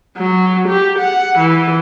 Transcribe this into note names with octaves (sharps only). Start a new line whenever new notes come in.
F#3
G4
F#5
E3